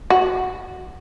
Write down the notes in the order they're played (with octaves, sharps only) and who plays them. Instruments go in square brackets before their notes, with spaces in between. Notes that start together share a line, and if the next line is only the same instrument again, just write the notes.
[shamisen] F#4